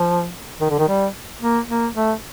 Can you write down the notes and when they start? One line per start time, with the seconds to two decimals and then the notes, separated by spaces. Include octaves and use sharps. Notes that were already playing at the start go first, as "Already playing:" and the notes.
Already playing: F3
0.60 D#3
0.70 D3
0.79 D#3
0.88 G3
1.40 A#3
1.68 A#3
1.94 A3